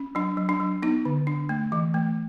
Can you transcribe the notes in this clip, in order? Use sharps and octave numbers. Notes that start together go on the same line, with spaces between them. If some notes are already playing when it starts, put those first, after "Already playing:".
Already playing: C#4
F#3 D4
F#3
D4
F#3
B3 D#4
D3
D4
A3
E3
A3